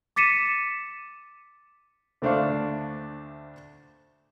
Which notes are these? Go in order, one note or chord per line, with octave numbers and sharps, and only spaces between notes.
D6 A6 B6 C#7 D#7 E7
D2 A3 D4 C5 F5 C#6